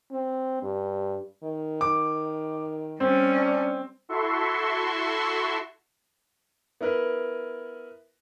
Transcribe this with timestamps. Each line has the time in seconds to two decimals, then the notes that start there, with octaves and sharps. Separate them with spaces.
0.11 C4
0.63 G2
1.44 D#3
1.81 D6
3.00 G3 C4 C#4
3.36 D4
4.09 E4 F#4 A4 E5 C6 C#6
6.81 B3 E4 A#4 B4